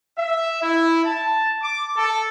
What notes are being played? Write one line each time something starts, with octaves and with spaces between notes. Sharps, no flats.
E5
E4
A5
D6
A4